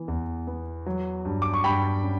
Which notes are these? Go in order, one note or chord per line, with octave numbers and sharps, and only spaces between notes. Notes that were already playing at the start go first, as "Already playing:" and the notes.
Already playing: E3 B3
E2
B3
F#3
G2
D6
C#6
G2 G5 B5
C#4